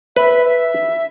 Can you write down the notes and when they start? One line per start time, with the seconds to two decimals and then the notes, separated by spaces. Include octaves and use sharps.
0.16 B4 E5
0.45 E5